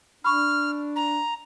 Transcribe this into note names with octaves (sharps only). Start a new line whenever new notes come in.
D4 B5 C#6 F6
A#5